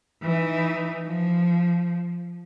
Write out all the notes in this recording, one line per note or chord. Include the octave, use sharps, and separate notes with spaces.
E3 D#4
F3